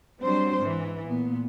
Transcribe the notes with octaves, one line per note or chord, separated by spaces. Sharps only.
F#3 G3 C4 D4 C5
G#2 E3
A#2 B3